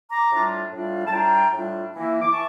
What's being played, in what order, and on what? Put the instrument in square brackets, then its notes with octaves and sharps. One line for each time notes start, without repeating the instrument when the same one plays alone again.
[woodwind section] A#5 D6
A2 G3 D4 F4
A2 G3 D4 F4
A5
A2 G3 D4 F4 G5 A#5
A2 G3 D4 F4
E3 A#3 E4
D6
E3 A5 C#6